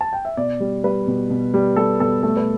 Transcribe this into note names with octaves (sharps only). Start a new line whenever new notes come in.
A5
G5
E5
B2 D5
G3
G3 B4
B2
B2
G3
G3 A4
B2 A4
A3 A4
B4